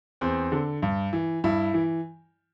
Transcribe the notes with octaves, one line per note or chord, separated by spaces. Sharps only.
E2 C4
D3
G2
E3
G2 E4
E3